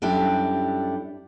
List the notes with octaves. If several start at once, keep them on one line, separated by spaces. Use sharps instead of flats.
F#2 G3 D4 E4 G4 A4